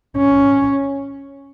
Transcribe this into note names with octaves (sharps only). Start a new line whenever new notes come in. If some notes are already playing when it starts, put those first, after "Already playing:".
C#4